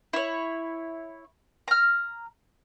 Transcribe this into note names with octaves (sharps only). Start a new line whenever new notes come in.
E4 C#5
A#5 F6